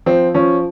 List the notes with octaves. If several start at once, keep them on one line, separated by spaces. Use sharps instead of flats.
F3 C4
F3 C#4